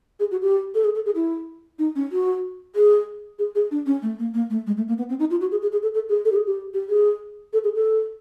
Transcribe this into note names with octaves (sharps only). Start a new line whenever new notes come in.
G#4
F#4
G4
A4
G#4
A4
G#4
E4
D#4
C#4
F#4
G#4
G#4
G#4
D4
C#4
A3
A#3
A#3
A3
G#3
A3
A#3
B3
C4
D#4
F4
F#4
G#4
G#4
G#4
A4
A4
G#4
A4
G4
G#4
G4
G4
G#4
A4
G#4
A4